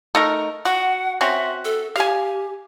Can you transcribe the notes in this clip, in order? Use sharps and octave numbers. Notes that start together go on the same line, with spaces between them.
A3 D#4 A#4
F#4 F#5
C4 C#4 F#4 E5
A4
G4 F5 G#5